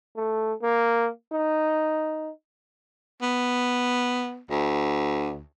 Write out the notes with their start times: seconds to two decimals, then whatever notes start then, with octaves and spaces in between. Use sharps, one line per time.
0.16 A3
0.63 A#3
1.33 D#4
3.22 B3
4.50 D2